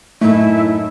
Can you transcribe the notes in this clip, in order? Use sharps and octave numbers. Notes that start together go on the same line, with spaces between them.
F#2 A2 A3 D#4 E4